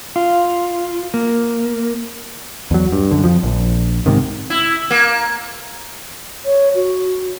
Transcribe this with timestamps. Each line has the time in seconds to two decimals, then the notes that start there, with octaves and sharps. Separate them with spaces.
0.16 F4
1.14 A#3
2.71 E2 F#3
2.92 G2
3.11 F#2 D3
3.24 F2 F3
3.43 A#1
4.06 G#2 C3 D#3
4.50 E4
4.91 A#3
6.45 C#5
6.75 F#4